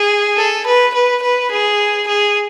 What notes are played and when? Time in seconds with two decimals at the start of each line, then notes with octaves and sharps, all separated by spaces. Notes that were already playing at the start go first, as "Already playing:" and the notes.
Already playing: G#4
0.37 A4
0.66 B4
0.94 B4
1.22 B4
1.51 G#4
2.07 G#4